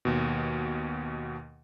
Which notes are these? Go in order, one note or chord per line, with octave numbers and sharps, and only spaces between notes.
D#2 B2